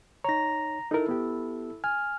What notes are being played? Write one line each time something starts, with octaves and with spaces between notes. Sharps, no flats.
D#4 C#5 A#5 A#6
D#4 E4 A4 A#4
B3 G4
G#5 F6